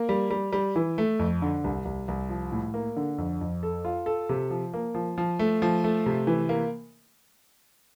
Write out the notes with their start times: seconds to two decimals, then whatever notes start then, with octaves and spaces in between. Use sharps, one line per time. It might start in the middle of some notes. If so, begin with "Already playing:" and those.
Already playing: A#3
0.09 G3
0.30 G3
0.53 G3
0.76 E3
0.98 A3
1.19 F2
1.42 D3
1.64 C2
1.85 C2
2.08 C2
2.29 F3
2.52 A2
2.74 A#3
2.96 D3
3.18 F2
3.41 F2
3.63 A4
3.85 F4
4.06 A4
4.29 C3
4.50 F3
4.74 A#3
4.94 F3
5.18 F3
5.39 A3
5.62 F3
5.84 A3
6.06 C3
6.27 E3
6.49 A#3